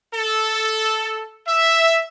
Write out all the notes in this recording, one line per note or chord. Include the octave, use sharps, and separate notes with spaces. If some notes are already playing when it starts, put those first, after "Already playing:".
A4
E5